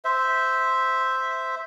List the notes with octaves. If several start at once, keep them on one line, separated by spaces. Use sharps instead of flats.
C5 E5